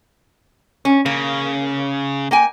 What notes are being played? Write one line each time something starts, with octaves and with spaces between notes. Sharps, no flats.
C#4
C#3 A#3
A#3 G5 G#5